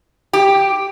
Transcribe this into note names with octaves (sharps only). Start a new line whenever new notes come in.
G4